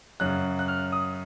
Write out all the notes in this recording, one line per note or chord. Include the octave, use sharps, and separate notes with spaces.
F#2 C#3 F#6
F#6
F6
D#6